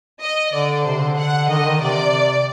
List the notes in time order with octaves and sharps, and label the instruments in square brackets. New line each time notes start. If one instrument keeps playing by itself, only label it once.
[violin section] D#5
[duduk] D3 [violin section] D5
[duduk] C3 [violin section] C5
[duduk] D3
[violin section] F#5
[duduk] D#3 [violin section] D#5
[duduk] D3
D#3
[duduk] C3 [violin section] D5